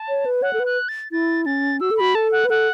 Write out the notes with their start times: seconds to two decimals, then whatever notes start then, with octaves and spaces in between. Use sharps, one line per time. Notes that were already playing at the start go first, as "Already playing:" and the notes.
Already playing: A5
0.09 C#5
0.26 B4
0.42 C#5 F#5
0.53 A4
0.60 B4
0.66 F#6
0.89 A6
1.11 E4 A6
1.46 C#4 A6
1.81 F#4 E6
1.91 A4
1.97 F#4 B5
2.15 A4 A5
2.32 F#5
2.45 B4
2.50 A4 F#5